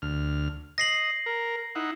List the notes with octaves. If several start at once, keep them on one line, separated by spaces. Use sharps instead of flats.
D2 F6
D#5 A#6 C7 F#7
A#4
D#4 E4 F#5